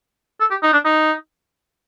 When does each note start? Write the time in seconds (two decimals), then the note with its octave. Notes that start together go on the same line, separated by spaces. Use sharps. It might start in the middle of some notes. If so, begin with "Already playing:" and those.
0.40 A4
0.51 G4
0.63 D#4
0.73 D4
0.85 D#4